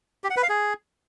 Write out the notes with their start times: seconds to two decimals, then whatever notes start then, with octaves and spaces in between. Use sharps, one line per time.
0.24 G4
0.30 F#5
0.37 B4
0.43 F5
0.49 G#4